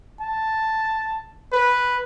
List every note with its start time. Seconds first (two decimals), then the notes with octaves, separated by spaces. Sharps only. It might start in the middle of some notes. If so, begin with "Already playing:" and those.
0.21 A5
1.53 B4